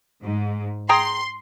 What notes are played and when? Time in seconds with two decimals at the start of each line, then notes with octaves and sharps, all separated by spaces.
0.23 G#2
0.89 G#4 G5 A#5 C6